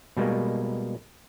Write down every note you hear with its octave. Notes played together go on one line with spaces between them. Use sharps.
B2 G3 G#3 A#3